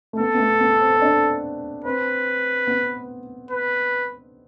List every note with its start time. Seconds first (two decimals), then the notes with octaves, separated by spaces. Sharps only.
0.13 A3
0.19 B3 A4
0.35 B3
0.40 A3
0.61 B3
0.81 C4
0.97 C4
1.02 D4
1.85 C4 B4
2.67 B3
3.51 B4